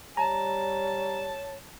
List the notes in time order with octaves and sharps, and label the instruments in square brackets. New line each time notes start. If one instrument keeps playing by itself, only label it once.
[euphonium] G3 [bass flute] C#5 [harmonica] A5 [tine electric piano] A#5